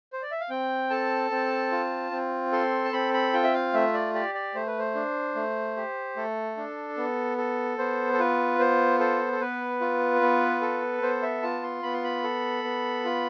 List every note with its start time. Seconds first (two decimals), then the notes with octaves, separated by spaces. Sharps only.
0.13 C5
0.22 D5
0.32 E5
0.40 F5
0.50 C4 G5
0.90 A4 A5
1.31 C4
1.71 F4
2.11 C4
2.52 A4 C6
2.84 A5
2.93 C4 B5
3.14 B5
3.33 F4 G5
3.44 E5
3.54 F5
3.74 A3 E5
3.94 D5
4.14 G4 D5
4.35 D5
4.55 A3 C5
4.67 B4
4.79 C5
4.95 D4
5.35 A3
5.77 G4
6.17 A3 A4
6.57 D4
6.97 B3
7.38 A4
7.78 B3 C5
8.13 A4
8.19 F4 B4
8.59 B3 C5
8.99 A4 C5
9.32 A4
9.40 B3 B4
9.81 F4
10.21 B3
10.62 A4
11.02 B3 C5
11.22 E5
11.43 F4 A5
11.63 C6
11.83 B3 B5
11.94 C6
12.04 B5
12.24 A4
12.64 B3
13.05 F4